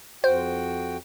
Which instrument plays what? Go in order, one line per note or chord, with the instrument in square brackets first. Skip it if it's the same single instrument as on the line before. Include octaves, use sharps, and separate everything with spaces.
[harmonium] F2 F#4 G5 [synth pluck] C5